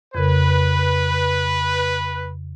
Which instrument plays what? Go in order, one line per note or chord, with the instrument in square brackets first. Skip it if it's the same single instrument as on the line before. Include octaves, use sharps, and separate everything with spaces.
[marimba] F2 C#3 A#4 [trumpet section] B4